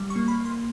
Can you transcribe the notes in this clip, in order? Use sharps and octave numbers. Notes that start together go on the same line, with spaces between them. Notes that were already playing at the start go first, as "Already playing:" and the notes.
Already playing: G3
C#6
A#3
B5
A#3
C6